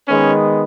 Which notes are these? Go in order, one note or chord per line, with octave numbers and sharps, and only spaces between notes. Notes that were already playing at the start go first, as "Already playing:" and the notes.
D#3 G#3 B3 C#4